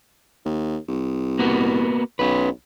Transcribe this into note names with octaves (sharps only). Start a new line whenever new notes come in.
D#2
C2
A#3 B3 F#4
B1 C#4 B4